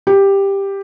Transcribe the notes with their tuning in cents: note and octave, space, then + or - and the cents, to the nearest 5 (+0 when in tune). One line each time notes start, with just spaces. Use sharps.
G4 +10